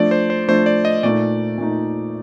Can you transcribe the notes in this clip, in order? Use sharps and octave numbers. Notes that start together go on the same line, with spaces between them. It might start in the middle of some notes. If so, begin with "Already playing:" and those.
Already playing: F3 A3 D4 D5
C5
C5
F3 A3 D4 C5
D5
D#5
A#2 A3 D#4 D5
A#2 A3 D#4